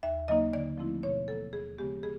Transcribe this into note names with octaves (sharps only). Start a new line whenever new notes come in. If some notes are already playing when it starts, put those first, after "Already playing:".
D#2 E5
C#3 F#3 A#3 D#4 D#5
D3 D5
F3 A3 C4 E4
B2 C#5
F#3 A#3 A4
D#2 G#4
C#3 F3 G#3 B3 G4
G#4